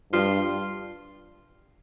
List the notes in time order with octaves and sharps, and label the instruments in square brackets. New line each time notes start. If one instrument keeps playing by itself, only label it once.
[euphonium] G2 [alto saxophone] F4